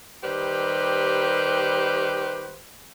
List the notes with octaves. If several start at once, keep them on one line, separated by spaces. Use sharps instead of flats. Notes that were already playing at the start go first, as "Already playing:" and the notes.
D#3 G3 G4 B4 C5